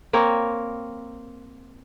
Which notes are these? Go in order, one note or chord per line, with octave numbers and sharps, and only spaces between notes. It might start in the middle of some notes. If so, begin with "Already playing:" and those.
A#3 C4 A#4 C#5